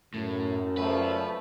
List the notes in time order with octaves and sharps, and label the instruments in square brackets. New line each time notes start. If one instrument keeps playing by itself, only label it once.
[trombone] F#2 [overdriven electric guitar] A2
[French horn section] A#2 C#3 F3 [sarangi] A3 [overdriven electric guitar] B4